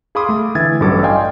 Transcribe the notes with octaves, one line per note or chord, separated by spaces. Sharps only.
G#4 F5 B5 C6 D6 D#6
A3
D3 E3 E5 G#6 A6
A1 G2 F#3 A4 D6
D5 D#5 F5 G5 G#5 C6